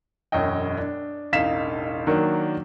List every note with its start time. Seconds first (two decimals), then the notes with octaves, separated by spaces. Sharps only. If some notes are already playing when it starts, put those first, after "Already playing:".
0.32 E1 F#2 C#4 D#5 G5
0.77 D4
1.32 E1 A1 D#4 F5 B6 E7
2.07 D#3 F#3 A#3 D4